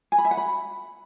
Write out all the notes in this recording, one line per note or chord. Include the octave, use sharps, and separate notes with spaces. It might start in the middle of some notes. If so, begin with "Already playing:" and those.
G#5
B5
E5
F#5
B5